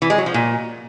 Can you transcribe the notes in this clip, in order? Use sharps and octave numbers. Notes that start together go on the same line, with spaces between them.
E3
G#3
F#3
F3
A#2